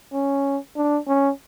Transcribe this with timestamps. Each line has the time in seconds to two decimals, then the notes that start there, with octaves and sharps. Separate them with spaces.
0.13 C#4
0.76 D4
1.08 C#4